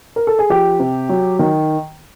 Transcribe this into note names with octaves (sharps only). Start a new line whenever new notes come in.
A#4
A4
G#4
F3 G4
C3
F#3
D#3